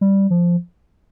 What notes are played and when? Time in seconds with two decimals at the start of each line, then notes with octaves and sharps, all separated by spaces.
0.01 G3
0.30 F3